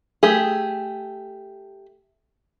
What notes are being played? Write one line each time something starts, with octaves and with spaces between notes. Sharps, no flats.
A3 G4 G#4